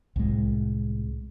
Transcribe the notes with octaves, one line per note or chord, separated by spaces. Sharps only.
C2 A2 G#3